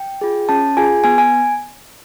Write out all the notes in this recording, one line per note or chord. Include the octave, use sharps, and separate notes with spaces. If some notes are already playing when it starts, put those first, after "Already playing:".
Already playing: G5
F4 G#4
C#4 A5
F4 G#4 G#5
B3 G#5
G#5